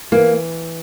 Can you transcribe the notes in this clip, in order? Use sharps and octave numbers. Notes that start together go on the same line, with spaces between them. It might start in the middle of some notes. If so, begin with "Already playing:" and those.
E3 A#3